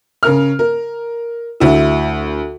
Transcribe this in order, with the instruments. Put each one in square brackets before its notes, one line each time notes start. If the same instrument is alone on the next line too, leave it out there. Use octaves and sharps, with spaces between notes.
[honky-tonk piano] C#3 A#4 F6
A#4
D2 E4